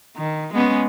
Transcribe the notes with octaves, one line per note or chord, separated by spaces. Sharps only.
D#3
G#3 B3 C#4